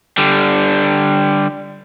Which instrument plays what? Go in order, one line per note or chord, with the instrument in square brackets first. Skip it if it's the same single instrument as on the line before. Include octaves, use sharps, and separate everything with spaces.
[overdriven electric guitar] D3 G3